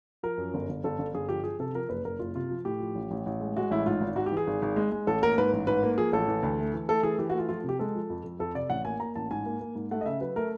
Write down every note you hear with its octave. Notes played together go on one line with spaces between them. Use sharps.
F3 A#4
F#2
G1
G1
G1 A4
G1
G1 G#4
F3 G4
F3 G#4
C3 A4
F3 A#4
F#1 B4
F#1 A#4
F#1 F4
C3 F4
F3
A2 G4
F3
A1
A1
A1
G#3
G#3 F#4
A1 E4
G#2 F4
G#1
G#2 F#4
G4
E3
G#4
G#1
G#1
G#3
G#3
A1 A4
A#3 A#4
G#2 B4
A1
G#2 B4
A#3
F3 G#4
A1 A4
E3
D2
A3
E3
A3 A4
E3 G#4
E3 G4
F#4
A3 F4
F3 F4
C3 G4
G#3 A4
F3
F2
F2
F2 A4
C3 D5
A1 F#5
A#3 G#5
A#3 A#5
A1 A5
G#2 G#5
A#3
A#3
G#2
A3 F#5
D#5
C#3 E5
F#3 B4
A3 A#4